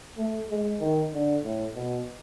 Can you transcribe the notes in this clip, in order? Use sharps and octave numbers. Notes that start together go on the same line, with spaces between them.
A3
G#3
D#3
D3
A2
B2